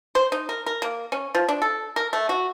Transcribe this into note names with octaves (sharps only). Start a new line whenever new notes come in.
C5
D#4
A#4
A#4
A#3
C#4
F3
D4
A4
A#4
A3
F#4